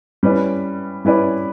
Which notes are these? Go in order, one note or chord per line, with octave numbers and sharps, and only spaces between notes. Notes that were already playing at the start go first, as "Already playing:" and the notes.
G3 C#4 E4 B4 D5
G3 C#4 E4 B4 D5